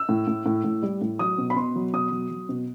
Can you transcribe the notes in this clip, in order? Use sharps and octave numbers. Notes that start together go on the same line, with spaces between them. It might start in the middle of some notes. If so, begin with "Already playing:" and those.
Already playing: E6
A2
A2
A2
A2
G3
A2
F#3 D#6
B2
B5
B2 C6
F#3
B2 D#6
F#3
F#3
B2